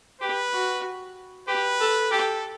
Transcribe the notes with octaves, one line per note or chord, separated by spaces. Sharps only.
G4 B4
F#4
G4 B4
A4
G4 A4